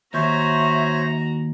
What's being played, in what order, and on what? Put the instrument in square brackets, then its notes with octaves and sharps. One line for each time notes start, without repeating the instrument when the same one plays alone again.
[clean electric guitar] D#2 [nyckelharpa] F#4 A#5 [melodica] C5 C#5 [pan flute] E5